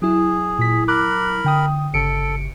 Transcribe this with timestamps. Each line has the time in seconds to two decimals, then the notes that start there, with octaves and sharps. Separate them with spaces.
0.02 F#3 E4 G#4
0.59 A#2 B6
0.88 A#4 B5 D6 F#6
1.44 D3 G5 D#6
1.94 G1 C#3 A4 C#7 D7